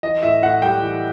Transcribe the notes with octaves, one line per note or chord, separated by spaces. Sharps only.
E3 D#5
A2 E5
A2 F#5
G3 G5
E3